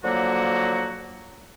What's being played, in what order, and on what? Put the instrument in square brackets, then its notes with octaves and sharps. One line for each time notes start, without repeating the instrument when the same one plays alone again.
[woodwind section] D3 F3 F#3 A#3 F#4